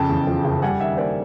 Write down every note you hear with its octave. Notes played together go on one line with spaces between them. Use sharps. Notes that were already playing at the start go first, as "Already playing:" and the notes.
Already playing: F2 C#3 G5 A5
E2
F3
F#1
G3 F#5 G#5
D#3 E5 F#5
A#3 C5 D5